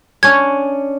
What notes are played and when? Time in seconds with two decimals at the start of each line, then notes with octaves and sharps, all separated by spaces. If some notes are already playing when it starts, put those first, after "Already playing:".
0.23 C#4 D4 G#6